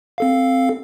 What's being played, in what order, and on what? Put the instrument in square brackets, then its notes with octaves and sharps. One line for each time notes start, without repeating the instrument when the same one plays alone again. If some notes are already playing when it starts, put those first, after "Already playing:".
[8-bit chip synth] C4 A4 F5